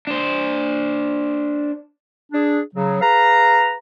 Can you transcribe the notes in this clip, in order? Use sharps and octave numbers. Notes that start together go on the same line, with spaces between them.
D4 C5
D4 G#4
C#3 F#3
G#4 B4 F5 A#5